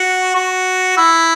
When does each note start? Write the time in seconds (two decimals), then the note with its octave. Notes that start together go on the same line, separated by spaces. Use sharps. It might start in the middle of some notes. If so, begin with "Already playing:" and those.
Already playing: F#4
0.35 F#4
0.97 E4